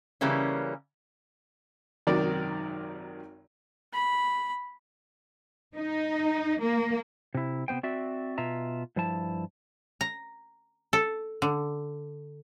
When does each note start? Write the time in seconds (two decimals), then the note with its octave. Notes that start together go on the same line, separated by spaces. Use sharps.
0.21 C#3 E3 G3 A#3 C#4
2.07 G#1 F#2 C3 D#3 A#4 D5
3.93 B5
5.76 D#4
6.61 A#3
7.35 C3 E4
7.68 C3 D#3 B3 C5 G5
7.83 C4 F#4 D5 E5
8.38 B2 F4 E5 A#5
8.96 G2 F3 E4 A5
10.01 A#5
10.93 A4
11.42 D3